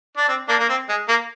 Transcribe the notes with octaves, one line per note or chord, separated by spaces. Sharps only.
D4
C4
A#3 D4
A#3
C4
G#3
A#3